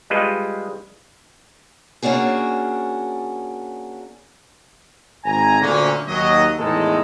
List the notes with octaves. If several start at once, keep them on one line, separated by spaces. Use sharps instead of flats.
G3 G#3 F4 B4 D#5
A#3 C#4 D4 F#4 G#4
G#1 G#5 A#5
D2 A#2 D3 C#4
D#2 F#3 D#5
E2 A2 D#3 G#3 D#4 A4